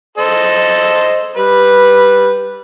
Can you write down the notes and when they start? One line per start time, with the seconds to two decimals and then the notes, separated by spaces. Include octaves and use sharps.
0.18 A4 C5 D#5
1.36 G3 B4